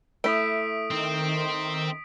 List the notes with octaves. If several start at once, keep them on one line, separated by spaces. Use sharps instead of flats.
A3 E4 D#6 B6 D7
D#3 C4